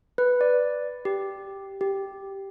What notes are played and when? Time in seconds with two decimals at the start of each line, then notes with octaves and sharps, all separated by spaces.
0.18 B4
0.41 D5
1.05 G4
1.81 G4